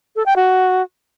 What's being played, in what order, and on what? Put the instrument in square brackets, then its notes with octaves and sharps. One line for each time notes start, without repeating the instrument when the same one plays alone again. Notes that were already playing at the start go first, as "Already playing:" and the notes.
[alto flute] A4
G5
F#4